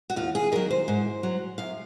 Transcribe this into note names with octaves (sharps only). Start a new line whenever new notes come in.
F#4
D#2 F4
G#4
D#3 F#3 A#4
C5
G#2
F#3
F#2 F5